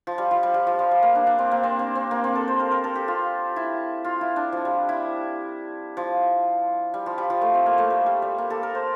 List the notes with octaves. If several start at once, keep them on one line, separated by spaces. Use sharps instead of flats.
F3
G3
F3
G3
G3
F3
F3
G3
A#3
D4
D4
C4
A#3
C4
C4
C4
A#3
C4
A4
C5
A#4
A#4
A4
G4
F4
E4
F4
E4
D4
F3
G3
E4
F3
G3
F3
G3
F3
A3
C4
A#3
A3
G3
G3
G3
A#3
A4
A#4
C5